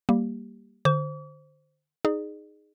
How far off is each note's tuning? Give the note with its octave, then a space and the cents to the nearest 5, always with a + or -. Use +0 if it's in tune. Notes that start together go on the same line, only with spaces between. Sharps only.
G3 +0 A#3 +0 G4 +0
D3 +30 C5 +0 D6 -45
D#4 +0 G#4 +0 D5 +45